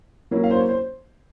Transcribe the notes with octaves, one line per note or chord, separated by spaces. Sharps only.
F#3 A#3 C#4 E4
F5
C5
C#5
C5